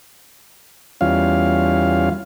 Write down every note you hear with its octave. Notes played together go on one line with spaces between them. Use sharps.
E2 G3 C#4 F4 F5